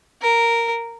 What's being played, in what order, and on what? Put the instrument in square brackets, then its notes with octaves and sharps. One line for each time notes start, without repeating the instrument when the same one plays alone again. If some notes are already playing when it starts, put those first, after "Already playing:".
[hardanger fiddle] A#4